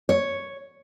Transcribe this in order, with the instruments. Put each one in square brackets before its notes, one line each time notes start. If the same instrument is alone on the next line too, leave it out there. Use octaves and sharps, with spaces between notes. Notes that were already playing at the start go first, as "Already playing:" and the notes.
[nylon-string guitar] C#5